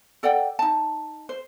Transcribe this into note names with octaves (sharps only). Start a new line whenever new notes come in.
A4 D5 F#5 G5
D#4 A5
C5